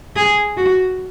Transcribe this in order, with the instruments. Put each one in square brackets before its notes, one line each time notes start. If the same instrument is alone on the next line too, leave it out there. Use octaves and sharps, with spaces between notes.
[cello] G#4
F#4